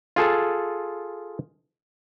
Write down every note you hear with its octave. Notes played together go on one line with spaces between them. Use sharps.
F4 G#4 A4